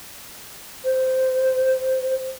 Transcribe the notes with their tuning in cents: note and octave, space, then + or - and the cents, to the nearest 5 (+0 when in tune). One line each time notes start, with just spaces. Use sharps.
C5 -10